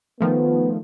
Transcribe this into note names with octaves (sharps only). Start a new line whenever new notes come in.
D#3 F3 A3 B3